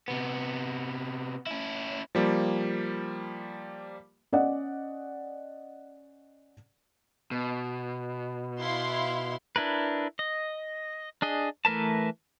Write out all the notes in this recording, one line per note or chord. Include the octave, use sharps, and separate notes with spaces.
C3 B3
C#4 E4
F3 G3 A#3
C#4 D5 D#5 F#5
B2
E4 F5 C6
D4 E4 A#4 B4
D#5
D4 G#4 D#5
E3 A3 A#4 B4 A5